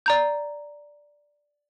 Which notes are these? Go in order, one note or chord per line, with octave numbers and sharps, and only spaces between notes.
D5 A#5 G6